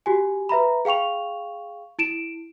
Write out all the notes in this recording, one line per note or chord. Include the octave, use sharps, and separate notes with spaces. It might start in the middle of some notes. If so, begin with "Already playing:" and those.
F#4 G4 G#5
B4 E5 A#5 B5
G#4 F5 G5 C#6 F7
E4 D7 E7